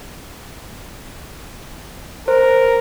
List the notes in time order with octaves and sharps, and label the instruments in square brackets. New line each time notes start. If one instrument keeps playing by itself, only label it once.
[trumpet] A#4 [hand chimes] C5